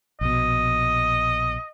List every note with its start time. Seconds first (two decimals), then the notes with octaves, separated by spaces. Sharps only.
0.21 A#1 B2 D#5